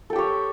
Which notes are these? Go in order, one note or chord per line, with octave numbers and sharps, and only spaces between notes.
G4 A4 C#5 G5